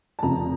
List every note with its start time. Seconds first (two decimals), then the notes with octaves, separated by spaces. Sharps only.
0.19 A5
0.22 F1 F2 C#3 F3 A#5